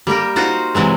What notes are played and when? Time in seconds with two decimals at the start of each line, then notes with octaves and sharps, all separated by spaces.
0.07 G3 A#3 G4 A#4
0.36 D#4 F4 F#4 C5
0.75 C3 E3 F#3 G#3